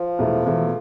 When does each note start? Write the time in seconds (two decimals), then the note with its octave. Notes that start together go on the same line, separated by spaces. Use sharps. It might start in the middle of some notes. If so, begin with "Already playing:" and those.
Already playing: F3
0.18 E1 E2 E3 A3 E4
0.46 E1 E2 E3 A3 E4